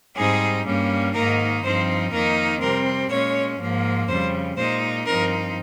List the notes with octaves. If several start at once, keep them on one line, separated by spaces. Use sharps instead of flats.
G#2 G3 C4 D#4 G#4
G2 G3 A#3 C#4
G#2 D#3 A#3 D#4 A#4
G2 F3 C4 D#4 C5
F2 D#3 A#3 D#4 A#4
C3 G3 C4 A#4
A#2 G#3 C#4 C#5
G#2 F3 A#3
F2 C#3 G3 C5
A#2 G#3 D#4 C5
G2 F3 C4 D#4 A#4